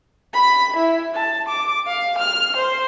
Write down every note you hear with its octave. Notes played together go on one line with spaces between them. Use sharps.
B5
E4
A5
D6
F5
F6
C5